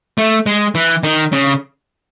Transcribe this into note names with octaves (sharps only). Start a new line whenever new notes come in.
A3
G#3
E3
D#3
C#3